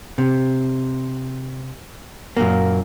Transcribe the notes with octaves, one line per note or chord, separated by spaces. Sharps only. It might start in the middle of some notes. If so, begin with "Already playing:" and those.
C3
F#2 A#2 A#3